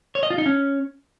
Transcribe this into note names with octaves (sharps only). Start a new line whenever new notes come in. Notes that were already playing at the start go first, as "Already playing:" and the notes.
C#5
D#5
F4
D#4
C#4